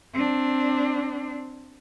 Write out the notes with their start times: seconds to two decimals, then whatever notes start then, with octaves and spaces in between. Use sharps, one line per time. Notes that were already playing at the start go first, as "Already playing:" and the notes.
0.14 C4 D4